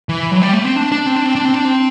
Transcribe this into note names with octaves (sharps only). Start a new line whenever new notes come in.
E3
F#3
G3
A3
C4
D4
D4
C4
D4
C4
D4
C4
D4
C4